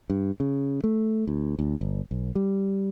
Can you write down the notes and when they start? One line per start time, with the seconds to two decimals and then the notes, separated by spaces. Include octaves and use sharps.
0.10 G2
0.40 C#3
0.84 A3
1.27 D2
1.59 D2
1.81 G1
2.11 B1
2.35 G3